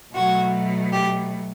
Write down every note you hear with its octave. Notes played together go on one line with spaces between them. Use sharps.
B2 F#3 A3 F#4
G4